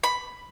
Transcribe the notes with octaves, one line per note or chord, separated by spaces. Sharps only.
B5